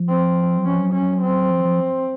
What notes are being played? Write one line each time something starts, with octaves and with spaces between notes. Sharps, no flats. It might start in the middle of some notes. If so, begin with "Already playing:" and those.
Already playing: F3
C4
F#3
F3 C#4
F#3
C#4
C4
F3
F3